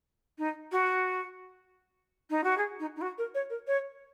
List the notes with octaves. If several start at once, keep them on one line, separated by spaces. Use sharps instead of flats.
D#4
F#4
D#4
F#4
G#4
D#4
D#4
F#4
A#4
C#5
A#4
C#5